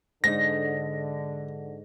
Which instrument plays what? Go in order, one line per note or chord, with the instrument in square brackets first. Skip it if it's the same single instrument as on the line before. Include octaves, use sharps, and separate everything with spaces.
[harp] G#2 D#4 [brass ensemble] D3 [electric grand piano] A#6